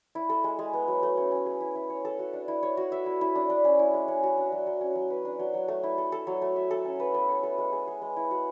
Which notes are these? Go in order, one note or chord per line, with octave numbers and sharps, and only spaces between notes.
E4
A4
G#3
G#3
B3
F#3
A3
C#4
C#4
G#4
E4
E4
C#5
A4
F#4
D4
E4
C#5
F#4
E5
E4
E4
D4
D4
C#4
E4
G#3
C#4
F#4
D4
F#3
F#3
C#4
F#3
B4
D4
F#3
F#3
A3
E4
A4
A4
F#3
A3
E5
A4
C#4
B4
B3
C#5
A4
G#3
G#4
G#4
G#3
E4
F#4